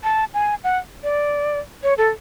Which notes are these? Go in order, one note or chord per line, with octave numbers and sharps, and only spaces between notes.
A5
G#5
F#5
D5
C#5
A4